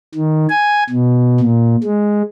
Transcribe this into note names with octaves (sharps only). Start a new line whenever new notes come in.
D#3
G#5
B2
A#2
G#3